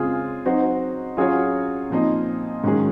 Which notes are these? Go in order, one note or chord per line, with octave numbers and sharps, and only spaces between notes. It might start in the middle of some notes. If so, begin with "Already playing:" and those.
Already playing: C#3 G#3 C4 F4 G#4
F#3 C4 D#4 F#4 C5
F#3 C#4 F4 F#4 G#4 C#5
A#2 F3 C4 D#4
G#2 D#3 F#3 C#4 G#4